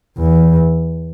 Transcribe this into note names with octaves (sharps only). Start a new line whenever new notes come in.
E2